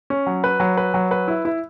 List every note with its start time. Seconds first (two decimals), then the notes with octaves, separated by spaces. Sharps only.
0.10 C#4
0.26 F#3
0.44 B4
0.60 F#3
0.77 B4
0.94 F#3
1.11 B4
1.28 E4
1.45 E4